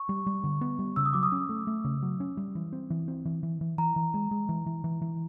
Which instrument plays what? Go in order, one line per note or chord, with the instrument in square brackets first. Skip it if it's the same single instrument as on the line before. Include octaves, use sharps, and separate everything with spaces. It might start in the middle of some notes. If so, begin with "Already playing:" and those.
Already playing: [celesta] C#6
[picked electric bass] G3
G3
D3
B3
G3
[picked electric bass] C#3 [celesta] E6
[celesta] D#6
[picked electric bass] F#3 [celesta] D6
[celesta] D#6
[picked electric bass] C#4
A3
A3
C#3
F#3
C#4
G3
E3
C4
E3
C4
E3
E3
E3
[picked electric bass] E3 [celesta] A#5
[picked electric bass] E3
G#3
G#3
E3
E3
E3
E3